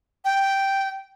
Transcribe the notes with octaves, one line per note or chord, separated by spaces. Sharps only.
G5